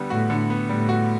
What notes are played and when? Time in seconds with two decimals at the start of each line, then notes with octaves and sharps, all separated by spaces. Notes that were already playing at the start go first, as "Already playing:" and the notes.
Already playing: D3 G3 B3
0.10 A2 F#4
0.30 D3
0.50 B3
0.69 A2 G3
0.89 F#4